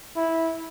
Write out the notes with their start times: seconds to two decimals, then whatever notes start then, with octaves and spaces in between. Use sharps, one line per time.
0.16 E4